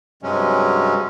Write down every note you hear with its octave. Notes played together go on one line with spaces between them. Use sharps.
G2 C3 F#3 G#3 C#4